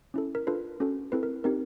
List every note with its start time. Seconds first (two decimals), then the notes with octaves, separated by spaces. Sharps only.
0.14 C#4 E4 A4
0.35 A#4
0.47 D4 F4 A4 B4
0.80 C#4 F#4 A4
1.12 C4 E4 A4 B4
1.23 A#4
1.44 C4 D#4 G4 A#4